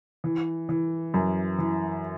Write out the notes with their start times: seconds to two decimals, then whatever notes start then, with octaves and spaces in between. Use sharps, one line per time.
0.24 E3
0.69 E3
1.14 F#2
1.59 E3